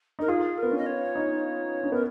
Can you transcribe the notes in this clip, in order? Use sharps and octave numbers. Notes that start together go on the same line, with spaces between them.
D#4 A#4
F4 G#4
A#4
B3
C#4
D#5
C#5
D#4
C#4
B3 A#4